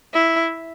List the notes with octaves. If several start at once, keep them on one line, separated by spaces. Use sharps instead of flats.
E4